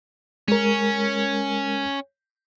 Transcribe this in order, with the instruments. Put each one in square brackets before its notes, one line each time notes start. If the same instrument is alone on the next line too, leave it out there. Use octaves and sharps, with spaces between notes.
[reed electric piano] G#3 A#4 [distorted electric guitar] C#4